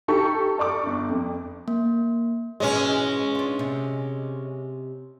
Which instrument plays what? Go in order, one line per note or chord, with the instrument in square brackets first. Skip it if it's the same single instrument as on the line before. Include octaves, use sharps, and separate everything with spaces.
[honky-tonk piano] D#4 G4 A4 C#6
A4 D5 C#6 D6
G1
F2
[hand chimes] A#3
[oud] G#2 B2 E3 [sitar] G#3 C#4
[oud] D4 F4
C3